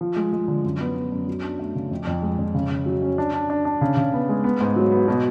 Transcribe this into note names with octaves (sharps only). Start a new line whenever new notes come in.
F3
G#3
G#3
D3
F#2
B3
B3
F#2
F#3
D4
A3
C#3
F2
F2
G#3
F2
C#3
C#3
F#3
C#4
D4
D4
D4
D4
C#3
C#3
B3
G#3
B3
G#2
F#3
B3
B2